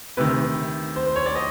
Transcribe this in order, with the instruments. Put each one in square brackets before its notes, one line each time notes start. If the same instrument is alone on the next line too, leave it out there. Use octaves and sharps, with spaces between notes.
[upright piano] D2 C3 D#3 B4
C5
C5
C#5
D5
D#5